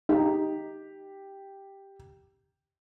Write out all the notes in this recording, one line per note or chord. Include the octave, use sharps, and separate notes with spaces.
D#4 G4